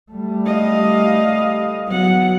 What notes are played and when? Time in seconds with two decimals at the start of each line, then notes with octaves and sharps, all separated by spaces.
0.12 G3 A3
0.46 D#5 F5
1.88 F#3 B3 F#5